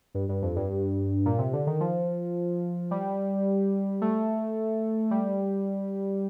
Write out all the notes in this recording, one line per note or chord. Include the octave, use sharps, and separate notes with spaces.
G2
G2
F2
G2
A#2
C3
D3
D#3
F3
G3
A3
G3